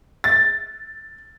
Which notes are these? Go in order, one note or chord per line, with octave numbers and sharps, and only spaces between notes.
A6